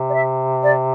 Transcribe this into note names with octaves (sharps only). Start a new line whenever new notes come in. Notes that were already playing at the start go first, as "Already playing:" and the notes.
Already playing: C3
D5
E5
D5